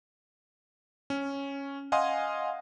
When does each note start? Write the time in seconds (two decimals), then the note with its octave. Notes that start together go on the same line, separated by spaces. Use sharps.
1.10 C#4
1.92 D#5 F5 F#5 G#5 C6 D#6